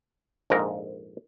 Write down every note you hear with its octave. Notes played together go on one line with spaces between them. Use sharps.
A#1 F2 G#2 A#4